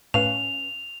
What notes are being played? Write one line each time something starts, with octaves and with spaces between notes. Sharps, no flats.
A2 C#4 B4 F5 F7